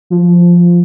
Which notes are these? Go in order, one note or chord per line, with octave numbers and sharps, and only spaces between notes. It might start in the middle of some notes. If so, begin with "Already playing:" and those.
F3